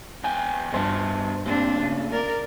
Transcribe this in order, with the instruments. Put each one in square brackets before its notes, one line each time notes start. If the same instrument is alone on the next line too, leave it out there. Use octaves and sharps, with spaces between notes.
[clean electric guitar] E2 G5 G#5
[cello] G2 [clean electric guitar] B2 C5 A5
[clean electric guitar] A2 A#3 G4 [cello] C4 D4
[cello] C#3
A#4 D5